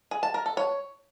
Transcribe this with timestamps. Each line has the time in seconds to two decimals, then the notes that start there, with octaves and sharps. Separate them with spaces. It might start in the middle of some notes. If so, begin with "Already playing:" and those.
0.11 G#4
0.23 A5
0.34 A#4
0.46 A4
0.57 C#5